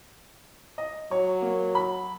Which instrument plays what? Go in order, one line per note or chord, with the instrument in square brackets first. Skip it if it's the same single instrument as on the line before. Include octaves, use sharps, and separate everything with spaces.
[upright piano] D#5
[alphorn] F#3 [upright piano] C#5
[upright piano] A#3
B5